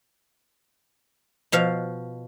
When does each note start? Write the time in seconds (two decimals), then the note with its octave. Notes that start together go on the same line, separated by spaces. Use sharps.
1.52 B2 F3 F5